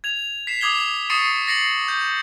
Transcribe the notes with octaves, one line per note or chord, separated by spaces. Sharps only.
G#6 F7
B6 C7 E7
D6 D#6 G#6 F7 G7
C#6 D#6 A6 C7 C#7 D#7
A6 A#6 C7 C#7 F#7
G6